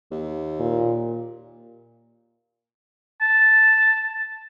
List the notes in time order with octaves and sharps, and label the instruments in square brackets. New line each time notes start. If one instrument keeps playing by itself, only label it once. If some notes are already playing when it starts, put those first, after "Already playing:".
[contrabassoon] D#2
[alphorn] A#2
[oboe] A5